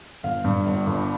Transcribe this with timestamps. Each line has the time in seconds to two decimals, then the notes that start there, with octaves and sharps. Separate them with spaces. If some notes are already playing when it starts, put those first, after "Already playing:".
0.23 G1 F5
0.44 G2
0.66 G1
0.87 G1